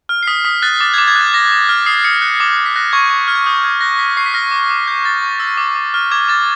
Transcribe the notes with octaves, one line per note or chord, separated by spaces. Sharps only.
F6
C7
D#6 B6
D#6 B6
F#6 A6
D6 A6
D6 G#6
G#6
F#6
A6
D6 A#6
D6
F6
D#6 C7
D#6 C#7
F#6 C#7
D6 C7
D6
B6
F#6 A#6
C#6 G#6
C#6
F6
G#6
D#6 G6
D#6 G#6
F#6 A#6
C#6 B6
C#6 C7
B6
F6 A#6
D6
D6
G6
G6 A6
C#6
E6
D6
D6
F6
D6 G#6
D6 A6